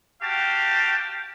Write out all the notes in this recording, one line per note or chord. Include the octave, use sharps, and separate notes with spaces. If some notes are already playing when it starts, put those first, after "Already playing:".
F#4 G4 F5 G5 A5